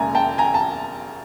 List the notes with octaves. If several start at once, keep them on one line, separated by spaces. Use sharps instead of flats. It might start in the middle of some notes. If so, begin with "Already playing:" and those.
Already playing: E1 D#2 C#3 G#5 A#5
G5 A5
G#5 A#5
A5